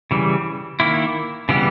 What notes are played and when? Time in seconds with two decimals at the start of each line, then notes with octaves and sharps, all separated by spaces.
0.11 C#3 E3 G3
0.80 D#3 A#3 E4
1.49 C#3 E3 G3 B3 G4